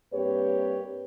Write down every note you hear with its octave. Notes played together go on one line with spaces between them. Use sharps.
G2 A#3 C4 G4 B4 C#5